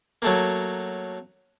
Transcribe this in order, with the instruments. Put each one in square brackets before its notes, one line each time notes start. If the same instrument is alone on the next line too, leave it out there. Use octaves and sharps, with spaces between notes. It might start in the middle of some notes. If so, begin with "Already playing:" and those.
[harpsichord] F#3 A3 A#3